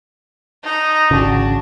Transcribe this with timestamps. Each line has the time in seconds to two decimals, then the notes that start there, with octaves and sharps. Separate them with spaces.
0.63 D#4 A#5
1.11 G#1 C#3 D4 F#4